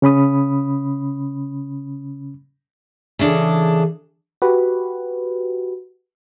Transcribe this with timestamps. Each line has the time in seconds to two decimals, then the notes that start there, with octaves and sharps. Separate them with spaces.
0.02 C#3 C#4 B5 D#6
3.19 C#3 E3 D4 G#4 A4
4.42 F#4 G4 B4